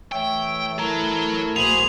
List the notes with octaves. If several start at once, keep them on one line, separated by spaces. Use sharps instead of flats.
E3 A3 C#5 E5 G5
E4 A4 A#4 C#5 A#5
B1 A#3 F#4 G#4 C5 B5 F7 F#7